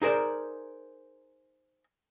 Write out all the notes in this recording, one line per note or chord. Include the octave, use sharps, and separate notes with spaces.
D#4 G#4 A#4 C5 D5